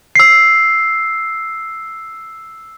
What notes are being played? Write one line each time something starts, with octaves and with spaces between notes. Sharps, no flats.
E6 C7